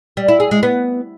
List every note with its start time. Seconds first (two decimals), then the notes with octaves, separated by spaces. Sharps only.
0.17 G3
0.28 E4
0.40 G#4
0.51 G#3
0.63 B3